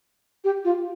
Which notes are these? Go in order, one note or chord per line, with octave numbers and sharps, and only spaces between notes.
G4
F4